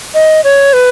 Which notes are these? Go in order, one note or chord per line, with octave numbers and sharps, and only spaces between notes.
D#5
C#5
B4